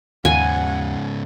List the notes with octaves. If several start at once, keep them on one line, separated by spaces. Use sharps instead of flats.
D#2 G#2 C#3 F#5 G#5